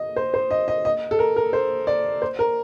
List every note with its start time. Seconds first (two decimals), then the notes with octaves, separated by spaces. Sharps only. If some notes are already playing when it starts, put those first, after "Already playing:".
Already playing: D#5
0.16 C5
0.34 C5
0.51 D#5
0.68 D#5
0.85 D#5
1.11 A4
1.19 A#4
1.36 A#4
1.53 C5
1.87 D5
2.22 C5
2.39 A#4